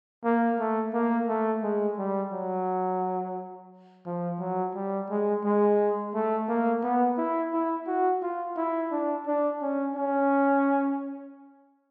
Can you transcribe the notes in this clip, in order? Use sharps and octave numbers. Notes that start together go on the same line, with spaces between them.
A#3
A3
A#3
A3
G#3
G3
F#3
F3
F#3
G3
G#3
G#3
A3
A#3
B3
E4
E4
F#4
F4
E4
D4
D4
C#4
C#4